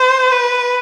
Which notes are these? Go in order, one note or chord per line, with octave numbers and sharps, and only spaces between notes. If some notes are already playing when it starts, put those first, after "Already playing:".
Already playing: C5
B4